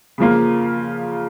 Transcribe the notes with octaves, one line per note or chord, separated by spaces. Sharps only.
C#3 F3 A#3 F4